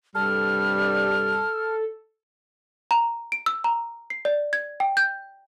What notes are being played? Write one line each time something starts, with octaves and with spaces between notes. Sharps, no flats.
G2 C3 G3 A4 F6
A#5
D7
E6
A#5
C7
D5
G#6
G5
G6